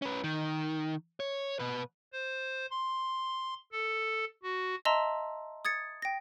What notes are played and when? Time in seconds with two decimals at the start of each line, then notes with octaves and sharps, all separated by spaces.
0.02 C#4 B4
0.24 D#3
1.20 C#5
1.60 B2 B4
2.13 C5
2.71 C6
3.72 A4
4.43 F#4
4.85 D#5 E5 A5 A#5 C6 E6
5.65 D#6 G#6 A6 C#7
6.02 G5 A#6